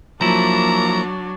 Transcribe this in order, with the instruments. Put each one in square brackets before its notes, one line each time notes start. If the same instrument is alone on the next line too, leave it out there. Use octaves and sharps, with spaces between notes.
[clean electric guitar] F3 E4 [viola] F#3 D4 [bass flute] A#3 [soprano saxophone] A#5